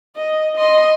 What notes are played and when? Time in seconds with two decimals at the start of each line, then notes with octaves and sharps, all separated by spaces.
0.16 D#5
0.56 D#5 C6